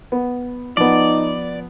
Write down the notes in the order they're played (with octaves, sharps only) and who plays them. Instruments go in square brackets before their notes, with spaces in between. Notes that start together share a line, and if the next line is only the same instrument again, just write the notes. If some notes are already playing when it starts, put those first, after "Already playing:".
[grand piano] B3
[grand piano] F3 B3 [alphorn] D#4 [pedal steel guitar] D5